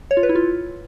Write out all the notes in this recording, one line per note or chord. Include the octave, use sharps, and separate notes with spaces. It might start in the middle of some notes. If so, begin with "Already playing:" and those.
C#5
F4
B4
E4
F4